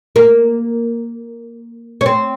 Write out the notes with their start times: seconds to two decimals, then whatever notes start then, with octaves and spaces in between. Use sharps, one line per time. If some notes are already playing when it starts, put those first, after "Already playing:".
0.16 A#3
2.01 C#4
2.06 C4